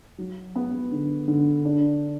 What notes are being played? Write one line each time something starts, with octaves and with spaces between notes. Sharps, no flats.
F#3
B3
D3
D3
D4